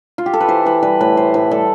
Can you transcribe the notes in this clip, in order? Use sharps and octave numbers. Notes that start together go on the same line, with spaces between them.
F4
G4
A4
B4
E3 C5
E3 B4
G3 B4
A2 B4
A3 C5
A2 B4
G3 A4